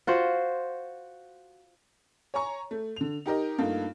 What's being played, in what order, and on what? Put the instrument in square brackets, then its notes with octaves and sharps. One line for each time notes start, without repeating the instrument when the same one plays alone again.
[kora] F4 F#4 C5 F#5
[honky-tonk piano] C#5 G#5 A#5 C#6
A3
D3 F7
D#4 G4 A#4 D#5
G2 A3 A#3 D#4 F4